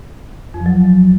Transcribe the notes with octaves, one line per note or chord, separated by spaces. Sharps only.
F2
F3
F#3